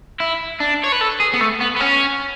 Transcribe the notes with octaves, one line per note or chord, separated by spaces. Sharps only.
E4
D4
C#5
B4
A4
G#4
B3
A3
B3
B3
C#4